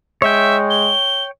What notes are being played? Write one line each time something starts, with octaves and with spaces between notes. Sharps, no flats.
G#3 C#5 E5 G5
G7